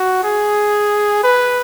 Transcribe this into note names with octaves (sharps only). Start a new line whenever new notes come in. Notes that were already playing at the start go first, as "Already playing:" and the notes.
Already playing: F#4
G#4
B4